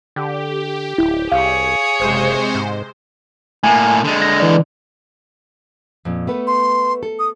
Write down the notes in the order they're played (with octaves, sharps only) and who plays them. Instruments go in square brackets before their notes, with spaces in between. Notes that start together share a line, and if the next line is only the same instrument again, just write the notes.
[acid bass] D3 [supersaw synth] G4
[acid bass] D1 [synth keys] E4
[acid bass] C2 [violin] G#4 C#5 [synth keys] F5
[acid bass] F#1 [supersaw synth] C3 G#3 C5
[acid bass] G#2
[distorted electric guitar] A2 A#3 [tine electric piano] G#5
[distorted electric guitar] D3 G#3
[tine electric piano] A#6
E3 D5
[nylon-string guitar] F2 A#2
A3 B3 B4
[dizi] C6
[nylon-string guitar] A4
[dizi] D#6